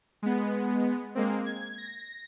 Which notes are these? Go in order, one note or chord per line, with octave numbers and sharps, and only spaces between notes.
G#3 B3
G#3 A#3 C4
G#6
A#6